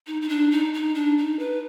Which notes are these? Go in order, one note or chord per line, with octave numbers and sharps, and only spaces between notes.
D#4
D#4
D4
D#4
D#4
D4
D#4
B4